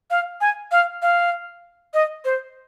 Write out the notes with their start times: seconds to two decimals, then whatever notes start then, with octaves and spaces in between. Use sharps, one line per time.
0.10 F5
0.41 G#5
0.72 F5
1.02 F5
1.94 D#5
2.25 C5